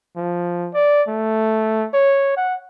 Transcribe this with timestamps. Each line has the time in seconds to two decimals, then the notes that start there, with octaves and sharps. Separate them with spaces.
0.16 F3
0.74 D5
1.08 A3
1.94 C#5
2.37 F#5